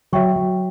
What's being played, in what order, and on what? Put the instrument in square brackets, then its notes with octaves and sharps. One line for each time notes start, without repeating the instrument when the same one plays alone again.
[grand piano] F#3 [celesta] F#4 C#5 E5 G5 C#6
[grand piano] F#3